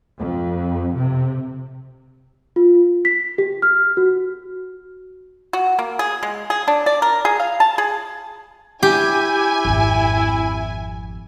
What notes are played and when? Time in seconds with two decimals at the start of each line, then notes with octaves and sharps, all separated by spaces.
0.18 F2
0.94 C3
2.56 F4
3.05 B6
3.38 G4
3.62 F6
3.97 F#4
5.53 F#4
5.79 A#3
5.99 G#4
6.23 G#3
6.50 G#4
6.68 D4
6.86 D5
7.02 A#4
7.25 G#4
7.40 F5
7.60 A5
7.78 G#4
8.83 E4 G4 G#5
9.65 G#1 F2